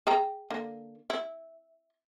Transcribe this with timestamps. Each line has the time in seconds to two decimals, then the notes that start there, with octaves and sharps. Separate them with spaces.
0.07 G#4 G5 A#5
0.50 D3 A#3
1.10 E4